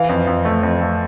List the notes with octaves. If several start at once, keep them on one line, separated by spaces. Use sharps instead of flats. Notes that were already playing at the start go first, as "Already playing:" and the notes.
Already playing: E3 F5
F2
F2
A3
F2
A3